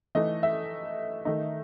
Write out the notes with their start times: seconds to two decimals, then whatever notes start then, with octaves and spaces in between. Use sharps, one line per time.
0.15 E3 A3 D#4 D#5
0.43 E5
1.25 D#3 A3 D#4